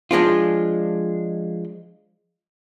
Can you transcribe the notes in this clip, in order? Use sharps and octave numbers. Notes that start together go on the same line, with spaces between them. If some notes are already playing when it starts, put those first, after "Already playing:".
F3 G#3 D4 F4